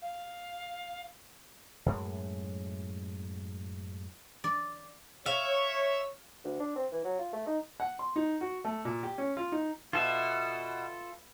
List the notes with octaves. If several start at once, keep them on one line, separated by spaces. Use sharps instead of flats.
F5
F#2 A2 G#3
D5
C#5 E5 F5
D2
D4
C4
E3
F#3
F4
A3
D#4
F#5
C6
D#4
F#4
A3
A#2
G4
C#4
F4
D#4
B2 F4 A4 E5